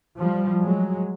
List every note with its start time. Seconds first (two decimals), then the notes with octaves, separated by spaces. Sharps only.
0.18 F3 G3
0.64 F#3 G#3